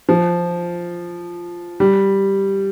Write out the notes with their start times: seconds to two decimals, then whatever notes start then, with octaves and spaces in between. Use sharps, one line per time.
0.09 F3
1.80 G3